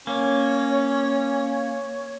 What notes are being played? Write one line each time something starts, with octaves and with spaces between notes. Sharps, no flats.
A#3 C#4 C#5